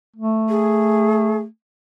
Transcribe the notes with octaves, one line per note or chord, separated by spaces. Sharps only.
A3
G#4